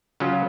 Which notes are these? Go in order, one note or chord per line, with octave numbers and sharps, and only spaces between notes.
C#3 F#3 C#4 F4